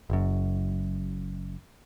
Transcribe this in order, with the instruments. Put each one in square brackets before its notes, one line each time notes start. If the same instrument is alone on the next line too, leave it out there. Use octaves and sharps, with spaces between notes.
[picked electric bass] F#1 F#2